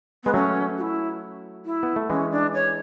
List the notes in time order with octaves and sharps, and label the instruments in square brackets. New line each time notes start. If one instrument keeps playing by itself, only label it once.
[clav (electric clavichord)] G#3 [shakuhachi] B3
[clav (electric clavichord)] F#3 A3 [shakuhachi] C#4
[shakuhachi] F#4
E4
E4
[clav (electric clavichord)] B3
A3
[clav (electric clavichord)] E3 G#3 [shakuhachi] C#4
[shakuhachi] D4
C#5